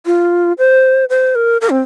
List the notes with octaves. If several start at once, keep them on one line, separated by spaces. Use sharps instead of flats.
F4
C5
C5
A#4
A#4
C4